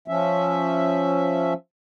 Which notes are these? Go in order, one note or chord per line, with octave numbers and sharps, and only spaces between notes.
F3 C#4 E5